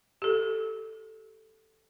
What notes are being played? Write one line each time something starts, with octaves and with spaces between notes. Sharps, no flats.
G4 A4